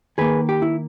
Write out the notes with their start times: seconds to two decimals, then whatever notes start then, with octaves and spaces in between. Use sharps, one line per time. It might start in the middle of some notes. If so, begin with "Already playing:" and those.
0.18 D#3 A#3 G#4 B4
0.49 G4
0.62 E4